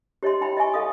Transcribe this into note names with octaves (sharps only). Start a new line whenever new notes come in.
G4 C#5 D#5 E5 C6
E4 G5 B5
D#5 E5 G#5 C#6
A4 D#5 F5 D#6